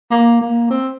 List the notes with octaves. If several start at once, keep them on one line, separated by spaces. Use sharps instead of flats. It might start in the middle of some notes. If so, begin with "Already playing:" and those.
A#3
A#3
C4